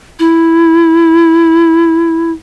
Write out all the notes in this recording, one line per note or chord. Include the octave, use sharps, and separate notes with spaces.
E4